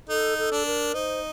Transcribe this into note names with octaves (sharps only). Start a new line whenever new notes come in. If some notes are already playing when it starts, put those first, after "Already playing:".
D#4 A4
A4
D4
A#4
D#4 C5